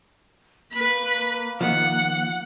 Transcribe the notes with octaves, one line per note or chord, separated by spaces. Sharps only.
A#3 B4 B5
D#3 F3 F#5